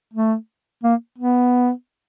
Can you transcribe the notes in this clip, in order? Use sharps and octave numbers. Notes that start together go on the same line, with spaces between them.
A3
A#3
B3